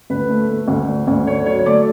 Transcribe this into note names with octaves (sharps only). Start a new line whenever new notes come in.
D2 B4
A3
A3
D2
D3
D2
D3 C#5
F#3 C#5
C#5
A3 D5